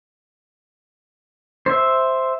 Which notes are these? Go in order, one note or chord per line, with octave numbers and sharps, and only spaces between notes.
C5 E5